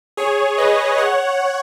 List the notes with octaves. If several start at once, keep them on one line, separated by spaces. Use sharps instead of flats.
G#4 C#5
B4 D#5
C#5 F#5